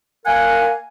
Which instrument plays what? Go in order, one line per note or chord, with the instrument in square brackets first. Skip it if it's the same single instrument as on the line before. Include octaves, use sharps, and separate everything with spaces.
[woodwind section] A#3 A#4 F#5 G#5